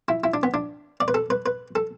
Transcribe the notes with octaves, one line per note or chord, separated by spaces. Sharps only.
E4
E4
D4
B3
D4
D5
B4
A4
B4
B4
A4